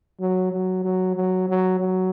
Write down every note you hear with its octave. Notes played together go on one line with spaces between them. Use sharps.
F#3
F#3
F#3
F#3
F#3
F#3